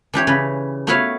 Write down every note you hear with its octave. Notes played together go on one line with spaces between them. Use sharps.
E3 D4 G4 C#5
C#3 B4
A3 B3 F#4 B4 C#5 F5